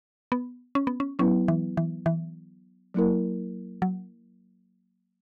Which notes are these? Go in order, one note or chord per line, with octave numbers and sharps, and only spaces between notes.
B3
C#4
B3
C#4
F#3 B3 C#4 E4 B4
E3
E3
E3
F#3 A#3 E4 A#4
F#3